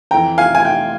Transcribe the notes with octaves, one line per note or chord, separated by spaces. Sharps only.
F2 E3 G5 A#5
F5 G#5
G#5
G5